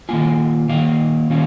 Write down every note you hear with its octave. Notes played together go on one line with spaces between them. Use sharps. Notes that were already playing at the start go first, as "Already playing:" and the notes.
D#3 A#3 F4 G#5
D#3 A#3 F4 F5
D#3 A#3 C#4 F4